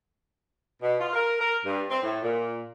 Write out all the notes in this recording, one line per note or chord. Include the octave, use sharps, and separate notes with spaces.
B2
F4
A#4
A#4
G2
C4
A2
A#2